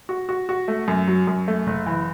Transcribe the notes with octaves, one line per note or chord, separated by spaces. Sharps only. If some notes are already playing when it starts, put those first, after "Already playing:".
F#4
F#4
F#4
A3
F#2
F#3
F#2
A3
F#1
E3